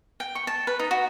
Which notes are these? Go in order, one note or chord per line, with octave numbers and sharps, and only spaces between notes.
G5
C#6
A5
B4
D#4
F#4